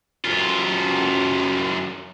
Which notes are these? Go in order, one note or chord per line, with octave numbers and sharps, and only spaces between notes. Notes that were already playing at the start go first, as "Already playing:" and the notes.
F#2 F4